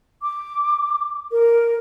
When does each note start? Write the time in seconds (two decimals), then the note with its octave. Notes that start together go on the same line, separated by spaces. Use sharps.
0.22 D6
1.32 A#4